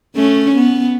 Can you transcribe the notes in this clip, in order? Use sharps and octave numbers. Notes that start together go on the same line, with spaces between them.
A3 C#4
B3